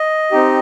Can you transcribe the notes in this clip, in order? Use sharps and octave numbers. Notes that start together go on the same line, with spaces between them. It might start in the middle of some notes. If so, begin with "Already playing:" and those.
Already playing: D#5
C4 D#4 G4